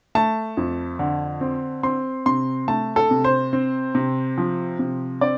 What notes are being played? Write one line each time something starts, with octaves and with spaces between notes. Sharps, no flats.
A3 A5
F2
D3
C4
C4 C6
C3 C6
A3 A5
A4
C3
C5
C4
C3
F3
C3
C4 D5